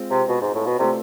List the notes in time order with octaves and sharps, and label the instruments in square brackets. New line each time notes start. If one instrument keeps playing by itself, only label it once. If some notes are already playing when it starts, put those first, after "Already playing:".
Already playing: [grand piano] G#3 C4 F4
[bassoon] C3
B2
G#2
A2
B2
[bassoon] C3 [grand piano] A3 C4 F4 A4 D5